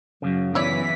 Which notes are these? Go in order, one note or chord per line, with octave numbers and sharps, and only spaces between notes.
F#2 A2 C#3 F#3
E3 B3 E4 C#5 D5 B6